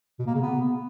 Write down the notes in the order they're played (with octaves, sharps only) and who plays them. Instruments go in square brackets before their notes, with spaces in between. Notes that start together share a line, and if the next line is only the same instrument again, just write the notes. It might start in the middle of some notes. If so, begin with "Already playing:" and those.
[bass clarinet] B2
A#3
C#3
B3